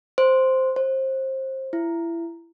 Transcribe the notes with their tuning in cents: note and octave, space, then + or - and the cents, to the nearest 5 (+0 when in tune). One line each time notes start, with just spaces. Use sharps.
C5 -5
C5 +25
E4 +25